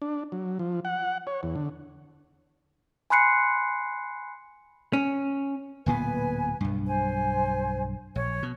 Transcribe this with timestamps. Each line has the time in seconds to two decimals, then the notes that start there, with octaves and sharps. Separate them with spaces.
0.02 D4
0.32 F#3
0.59 F3
0.85 F#5
1.27 C#5
1.43 E2
1.56 D3
3.10 G#5 B5 C6 F#6 C7 C#7
4.93 C#4
5.86 D1 A#2 B3 B4 G#5
6.61 B1 G2
6.87 C5 G#5
8.16 A#1 C#5
8.43 B2